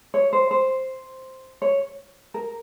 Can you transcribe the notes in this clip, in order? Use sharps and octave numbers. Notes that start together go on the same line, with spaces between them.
C#5
C5
C5
C#5
A#4